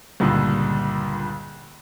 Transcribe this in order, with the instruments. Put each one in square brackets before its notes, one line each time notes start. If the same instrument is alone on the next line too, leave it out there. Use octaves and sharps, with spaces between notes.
[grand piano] C#2 G2 A#2 D3